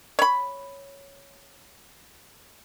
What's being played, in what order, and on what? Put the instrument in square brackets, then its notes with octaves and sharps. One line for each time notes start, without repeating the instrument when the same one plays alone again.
[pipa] C#5 B5